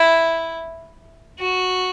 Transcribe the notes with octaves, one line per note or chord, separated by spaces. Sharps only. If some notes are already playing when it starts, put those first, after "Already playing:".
Already playing: E4
F#4